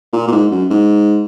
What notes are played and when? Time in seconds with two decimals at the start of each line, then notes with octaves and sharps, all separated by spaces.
0.13 A#2
0.28 A#2
0.32 G#2
0.51 F#2
0.70 G#2